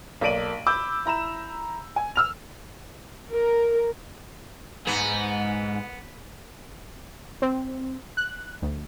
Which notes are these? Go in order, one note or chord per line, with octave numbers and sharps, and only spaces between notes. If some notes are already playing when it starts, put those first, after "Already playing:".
B1 A#3 D5 D7 D#7 F#7
B5 D6 E6 G6
E4 A#5 B5 E7
G#5
E6 F6 F7
A#4
G#2 B3
C4
F#6
D2